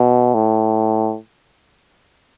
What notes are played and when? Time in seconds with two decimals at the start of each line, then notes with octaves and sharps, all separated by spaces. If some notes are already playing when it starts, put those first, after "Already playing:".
Already playing: B2
0.34 A2